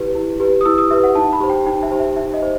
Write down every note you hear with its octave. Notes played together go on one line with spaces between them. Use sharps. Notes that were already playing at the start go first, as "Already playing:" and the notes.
Already playing: E4 G4 B4
E4
G4 B4
D#6
E4 E6
D#6
G4 B4 E5
F#5
D#4 A5
B5
G4 C5
G5
D#4 G5
E5
G4 C5
E5
D#4 E5
D#5
C5